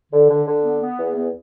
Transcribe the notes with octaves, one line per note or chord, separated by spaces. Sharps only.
D3
D3
D3
B3
B3
E2
B3